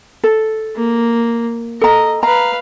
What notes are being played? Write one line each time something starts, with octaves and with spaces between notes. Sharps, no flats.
A4
A#3
A4 D#5 A#5
B4 F5 A#5